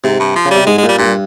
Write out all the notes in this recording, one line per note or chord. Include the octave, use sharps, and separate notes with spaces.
G#2 C3
G2
F3
C#3
G3
C3
G#2 G#3
G#3
A#2
G3
G2 A#2